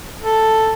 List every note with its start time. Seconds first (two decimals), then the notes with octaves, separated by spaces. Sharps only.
0.21 A4